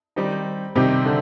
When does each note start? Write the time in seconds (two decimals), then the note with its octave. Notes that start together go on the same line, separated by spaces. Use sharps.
0.16 D#3 G3 C4 D#4 G4
0.75 C3 D#3 G3 C4 D#4 G4
1.05 D3